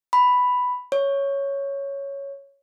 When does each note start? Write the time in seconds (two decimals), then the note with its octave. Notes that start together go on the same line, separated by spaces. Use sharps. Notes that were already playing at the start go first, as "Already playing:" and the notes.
0.13 B5
0.92 C#5